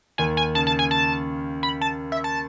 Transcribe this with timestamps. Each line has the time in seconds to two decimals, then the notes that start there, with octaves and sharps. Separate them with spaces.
0.18 D#2 D#3 G#5
0.37 G#5
0.55 C#3 A5
0.67 A5
0.79 G#5
0.91 A5
1.63 B5
1.81 A5
2.12 E5
2.24 A5